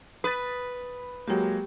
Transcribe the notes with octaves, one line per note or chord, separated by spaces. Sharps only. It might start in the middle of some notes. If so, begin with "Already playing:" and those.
B4 D#6 A6
F#3 G#3 A#3 G4 G5